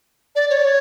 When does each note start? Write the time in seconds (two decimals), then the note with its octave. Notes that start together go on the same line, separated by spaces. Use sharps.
0.36 D5
0.50 C#5
0.57 D5
0.65 C#5